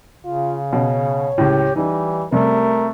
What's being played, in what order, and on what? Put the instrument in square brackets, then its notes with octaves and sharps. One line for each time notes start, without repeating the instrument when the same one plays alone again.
[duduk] C#3 [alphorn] F4
[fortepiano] B2 [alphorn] C#5
[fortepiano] C#2 A2 [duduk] G4
[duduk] E3 [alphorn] G3 [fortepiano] D#4
[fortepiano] C3 G3 [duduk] A3 [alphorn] A#4